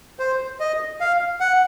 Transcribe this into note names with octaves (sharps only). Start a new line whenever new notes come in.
C5
D#5
F5
F#5